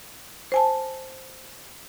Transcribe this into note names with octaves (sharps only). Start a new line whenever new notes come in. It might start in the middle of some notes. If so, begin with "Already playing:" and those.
C5 G#5 A5